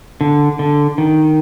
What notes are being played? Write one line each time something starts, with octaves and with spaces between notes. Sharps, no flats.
D3
D3
D#3